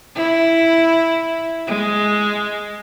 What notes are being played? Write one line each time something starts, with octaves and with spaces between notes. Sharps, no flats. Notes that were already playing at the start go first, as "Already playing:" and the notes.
E4
G#3